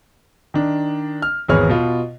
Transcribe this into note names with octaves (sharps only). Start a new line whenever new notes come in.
D#3 D4
F6
G#1 E2 B3 G#4 C#5 F6
B2 F4